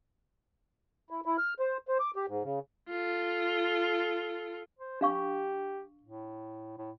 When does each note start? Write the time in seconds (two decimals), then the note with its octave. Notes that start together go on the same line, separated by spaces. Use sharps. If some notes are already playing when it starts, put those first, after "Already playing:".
1.10 E4
1.26 E4
1.38 F6
1.60 C5
1.88 C5
2.00 D6
2.16 G4
2.28 G#2
2.43 C#3
2.90 F4 A4
4.79 C5
5.01 D4 G4 F5 C#6
6.03 A2
6.78 A2